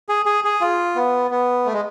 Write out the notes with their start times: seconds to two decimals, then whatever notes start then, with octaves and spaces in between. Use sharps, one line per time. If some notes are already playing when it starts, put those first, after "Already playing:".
0.09 G#4
0.26 G#4
0.44 G#4
0.61 F4
0.96 B3
1.31 B3
1.66 A3
1.74 G#3